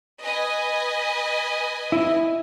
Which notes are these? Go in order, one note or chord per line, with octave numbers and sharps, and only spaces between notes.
B4 D#5 G#5
E4